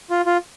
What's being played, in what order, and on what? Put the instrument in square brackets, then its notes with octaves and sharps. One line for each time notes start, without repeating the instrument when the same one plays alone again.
[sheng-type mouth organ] F4
F4